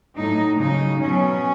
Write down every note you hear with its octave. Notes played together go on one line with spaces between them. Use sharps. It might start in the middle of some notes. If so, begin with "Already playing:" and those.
A2 F#3 D#4
C#3 F#3 D#4
B2 F#3 C#4